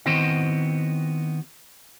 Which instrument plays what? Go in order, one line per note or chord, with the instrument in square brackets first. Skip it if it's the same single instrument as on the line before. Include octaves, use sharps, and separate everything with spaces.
[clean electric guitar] D#3 B3 C4 E4 F#4 D#5